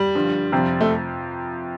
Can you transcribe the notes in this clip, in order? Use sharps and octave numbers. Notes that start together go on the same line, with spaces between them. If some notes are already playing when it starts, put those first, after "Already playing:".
Already playing: G3
G2 D3 F3
F2 C3 F3 C4
A3